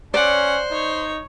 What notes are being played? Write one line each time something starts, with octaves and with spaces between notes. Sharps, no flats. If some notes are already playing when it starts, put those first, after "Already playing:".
C#4 C5 D5 F#5
D#4 C#5